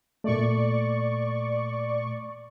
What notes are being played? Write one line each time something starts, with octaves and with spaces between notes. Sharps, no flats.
A#2 A3 D5 C#6